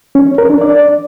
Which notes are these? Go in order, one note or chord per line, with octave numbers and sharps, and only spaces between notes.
C#4
C#5
A#4
D4
D5